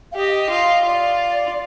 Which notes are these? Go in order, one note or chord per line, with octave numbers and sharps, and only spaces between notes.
F5
G4 D#5
F4
F4 D5